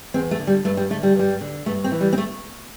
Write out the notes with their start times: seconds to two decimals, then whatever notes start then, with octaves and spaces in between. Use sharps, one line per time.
0.14 E2 C4
0.31 A3
0.39 D3
0.47 G3
0.65 G2 A3
0.77 G3
0.90 D3 A3
1.03 G3
1.15 G2 G3
1.41 D3
1.66 G2 A3
1.84 C4
1.92 E3
2.01 G3
2.13 C4
2.18 A3